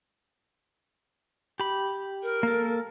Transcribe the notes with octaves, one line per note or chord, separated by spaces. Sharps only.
G4 B5
A#4
A#3 A4